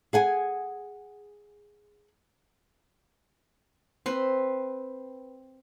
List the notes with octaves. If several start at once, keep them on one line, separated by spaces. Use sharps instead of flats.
G#4 F#5 G#5
C4 B4